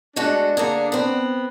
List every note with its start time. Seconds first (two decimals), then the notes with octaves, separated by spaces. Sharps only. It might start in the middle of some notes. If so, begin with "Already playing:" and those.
0.16 G#3 A3 D4 F#4
0.57 D3 A#3 G#4
0.92 B3 C4